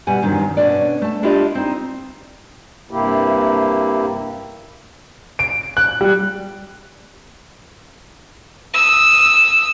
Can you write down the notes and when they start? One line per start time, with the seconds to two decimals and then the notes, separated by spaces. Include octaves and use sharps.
0.07 B2 G3 F#5 G#5
0.21 E2 G2 C3 D#3 F#3
0.57 B2 D3 C#4 D4 D5
1.02 A3 A5
1.23 D4 E4 F4 G4 D5 D#5
1.55 C4 D#4
2.91 G2 C3 A#3 E4 G4
5.39 D7
5.77 F#6
6.01 G3
8.74 D#6 E6